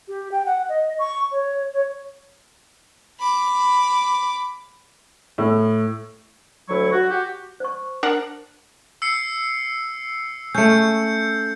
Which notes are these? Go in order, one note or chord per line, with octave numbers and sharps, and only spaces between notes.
G4
G5
F#5
D#5
C#6
C#5
C#5
B5 D6
A2
D2 F#3 E4 C#6
F#4
F#4 G4
C5 C#6
D4 A#4 F#5
E6 C7 C#7
A3 C#4 G6 C#7